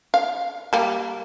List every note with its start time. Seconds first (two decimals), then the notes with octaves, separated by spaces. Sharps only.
0.14 F5
0.73 G3 A#3